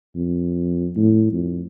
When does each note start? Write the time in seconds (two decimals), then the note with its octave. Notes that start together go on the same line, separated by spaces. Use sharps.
0.16 F2
0.96 A2
1.32 F2